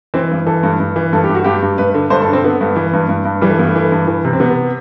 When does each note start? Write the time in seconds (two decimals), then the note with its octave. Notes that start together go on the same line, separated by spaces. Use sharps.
0.14 E3 C4
0.31 G2
0.47 E3 A4
0.63 G2
0.80 G2
0.96 E3
1.13 G2 A4
1.24 G4
1.29 G2
1.35 F#4
1.44 G2 G4
1.62 G2
1.78 G2 B4
1.94 D3
2.10 G2 C5
2.22 A4
2.28 D3
2.33 C4
2.44 D3 B3
2.61 G2
2.76 E3
2.93 G2
3.09 G2
3.25 G2
3.41 E3 G3
3.50 A3
3.59 G2 B3
3.67 A3
3.75 E3
3.92 G2
4.07 E3
4.24 C3
4.33 C4
4.40 C3 B3